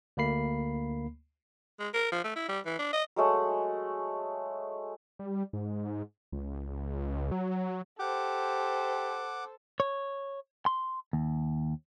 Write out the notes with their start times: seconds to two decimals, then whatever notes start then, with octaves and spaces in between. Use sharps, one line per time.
0.17 D2 A3 A#3 B5 C7
1.79 G#3
1.94 A#4
2.12 F3
2.24 A3
2.36 E4
2.49 G3
2.66 E3
2.79 D4
2.93 D#5
3.16 F#3 G#3 A3 F#5
5.19 G3
5.53 G#2
6.32 C#2
7.32 F#3
7.99 G4 A4 C5 F#5 D6
9.80 C#5
10.66 C6
11.13 D#2